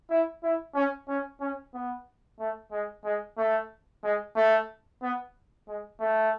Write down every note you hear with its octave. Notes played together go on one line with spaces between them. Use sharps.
E4
E4
C#4
C#4
C#4
B3
A3
G#3
G#3
A3
G#3
A3
B3
G#3
A3